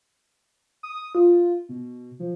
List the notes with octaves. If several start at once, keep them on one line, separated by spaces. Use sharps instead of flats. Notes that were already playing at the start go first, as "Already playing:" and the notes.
D#6
F4
B2
F3